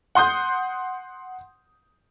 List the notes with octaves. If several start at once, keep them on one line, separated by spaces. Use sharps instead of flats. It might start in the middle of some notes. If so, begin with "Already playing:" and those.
F#5 C6 D#6 G6